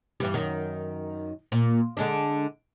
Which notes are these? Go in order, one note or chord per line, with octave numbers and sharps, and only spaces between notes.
G2 E3 G3
F#2 D#3
A#2
D3 G#3 D4